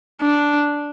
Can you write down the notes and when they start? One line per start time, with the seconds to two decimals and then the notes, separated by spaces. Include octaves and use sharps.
0.21 D4